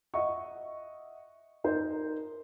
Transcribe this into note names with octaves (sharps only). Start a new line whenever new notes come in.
D#5 E5 F#5 C#6
D#4 A#4 C5